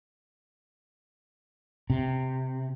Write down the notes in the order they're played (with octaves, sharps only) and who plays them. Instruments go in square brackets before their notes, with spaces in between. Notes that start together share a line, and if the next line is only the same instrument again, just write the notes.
[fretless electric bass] C3